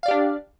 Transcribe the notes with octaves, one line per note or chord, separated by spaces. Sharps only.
D4 G4 D5 F5